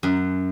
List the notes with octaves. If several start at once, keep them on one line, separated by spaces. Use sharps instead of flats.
F#2